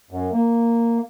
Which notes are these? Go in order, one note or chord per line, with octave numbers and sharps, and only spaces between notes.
F#2
A#3